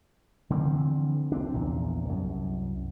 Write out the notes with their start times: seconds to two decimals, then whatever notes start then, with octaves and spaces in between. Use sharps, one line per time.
0.50 D3 E3 F3 C4
1.32 C2 C4 D4
1.54 A#1 E2 A#2
2.05 C2 F#2